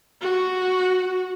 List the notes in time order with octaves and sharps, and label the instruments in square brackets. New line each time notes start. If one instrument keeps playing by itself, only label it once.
[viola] F#4